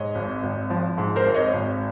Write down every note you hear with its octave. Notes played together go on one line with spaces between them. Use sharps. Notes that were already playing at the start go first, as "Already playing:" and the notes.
Already playing: G#2 C#5 D#5
G#1
G#1
F3
G#2
A#4 C5
G#1
C#5 D#5
G#1